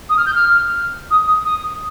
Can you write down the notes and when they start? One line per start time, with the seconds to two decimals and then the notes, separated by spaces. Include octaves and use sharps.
0.09 D#6
0.17 F6
0.26 G6
0.35 F6
1.11 D#6
1.27 D#6
1.44 D#6